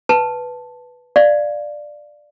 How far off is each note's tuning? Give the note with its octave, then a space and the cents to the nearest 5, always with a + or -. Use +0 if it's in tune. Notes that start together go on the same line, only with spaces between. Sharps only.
B4 +0 A5 +0
D5 +10 F5 +0